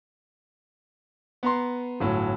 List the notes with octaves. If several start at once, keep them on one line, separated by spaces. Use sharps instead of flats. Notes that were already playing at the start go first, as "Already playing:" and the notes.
B3 A#5 C6
G1 A2 F#3